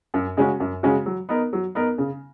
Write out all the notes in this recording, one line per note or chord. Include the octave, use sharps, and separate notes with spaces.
F#2
C#3 G#3 C#4 F#4
F#2
C#3 G#3 C#4 F#4
F#3
B3 D#4 A#4
F#3
B3 D#4 A#4
C#3